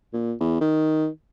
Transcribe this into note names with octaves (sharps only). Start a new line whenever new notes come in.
A#2
E2
D#3